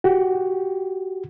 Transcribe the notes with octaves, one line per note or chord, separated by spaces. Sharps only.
F#4 G4